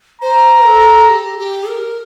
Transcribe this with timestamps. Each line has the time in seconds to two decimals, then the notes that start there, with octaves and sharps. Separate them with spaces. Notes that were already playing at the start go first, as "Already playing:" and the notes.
0.21 C5 A#5
0.66 A4
1.09 G4
1.39 G4
1.69 A#4